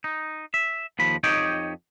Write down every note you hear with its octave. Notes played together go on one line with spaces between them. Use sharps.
D#4
E5
D#2 F3 B5
F2 D#4 G4 C#5 D#5 G5